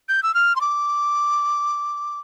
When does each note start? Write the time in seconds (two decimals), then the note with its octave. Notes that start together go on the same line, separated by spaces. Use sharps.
0.09 G6
0.23 E6
0.34 F6
0.56 C6
0.61 D6